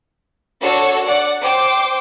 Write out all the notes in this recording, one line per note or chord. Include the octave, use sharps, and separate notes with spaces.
D4 F#4 A4 C#5
D5 F#5
C5 G5 D6